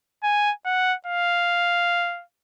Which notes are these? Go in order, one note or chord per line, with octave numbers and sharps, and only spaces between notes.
G#5
F#5
F5